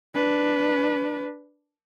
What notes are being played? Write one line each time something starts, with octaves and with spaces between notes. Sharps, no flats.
D4 B4